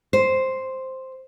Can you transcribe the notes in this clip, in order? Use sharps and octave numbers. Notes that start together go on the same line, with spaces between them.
C5